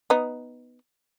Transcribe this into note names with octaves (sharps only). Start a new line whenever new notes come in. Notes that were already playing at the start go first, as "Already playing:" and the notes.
B3 D#4